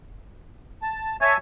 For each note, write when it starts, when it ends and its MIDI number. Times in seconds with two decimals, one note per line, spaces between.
0.82 1.17 81
1.21 1.34 73
1.21 1.37 76
1.21 1.37 80
1.21 1.37 81